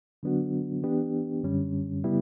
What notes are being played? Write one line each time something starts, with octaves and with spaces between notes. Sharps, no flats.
D3 F#3 B3 D4 F#4
E3 B3 D4 G4
F#2 D3 G3 C#4
C#3 G3 B3 E4